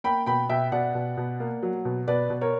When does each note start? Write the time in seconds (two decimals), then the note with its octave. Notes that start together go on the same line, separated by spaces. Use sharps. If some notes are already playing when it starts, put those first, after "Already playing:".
0.04 A#3 G5 B5
0.26 B2 G5 B5
0.49 B2 E5 G5
0.72 B2 D5 F#5
0.95 B2
1.17 B2
1.40 A#3
1.63 F#3
1.85 B2
2.08 B2 B4 D5
2.30 B2
2.41 A#4 C#5